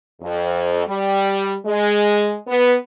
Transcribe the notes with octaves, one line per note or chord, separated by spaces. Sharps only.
F2
G3
G#3
B3